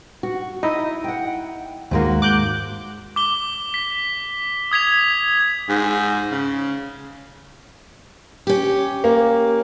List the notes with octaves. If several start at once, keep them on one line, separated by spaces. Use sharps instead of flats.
F#4
D#4 E4 D#5
F#5 G5
D#2 G#2 G#3 A#3 F#4
D6 F#6 G6
D6 G7
B6
D#6 G#6 B6 F7
G#2
C#3
C#4 G4
A#3